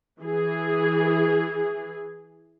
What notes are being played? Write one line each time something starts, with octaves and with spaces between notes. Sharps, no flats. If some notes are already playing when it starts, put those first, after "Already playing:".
E3 G#4